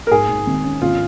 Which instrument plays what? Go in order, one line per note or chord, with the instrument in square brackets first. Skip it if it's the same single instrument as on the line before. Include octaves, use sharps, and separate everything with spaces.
[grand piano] A#4
[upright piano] G#2 [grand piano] G#4
[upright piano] G#2
G#1
C#4
[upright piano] G#1 [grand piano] F4